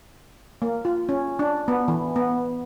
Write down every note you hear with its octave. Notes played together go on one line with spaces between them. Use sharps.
A#3
F4
C#4
D4
B3
E3
B3